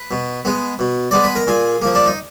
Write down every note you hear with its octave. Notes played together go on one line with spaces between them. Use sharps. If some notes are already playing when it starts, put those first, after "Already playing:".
Already playing: B4
B2
G#3 B3
B2
G#3 B3 D5
B4
A#4
A#2 G#4
F3 A#3
D4
D#4